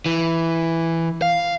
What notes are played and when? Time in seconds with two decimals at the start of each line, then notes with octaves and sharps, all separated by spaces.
0.06 E3
1.22 F5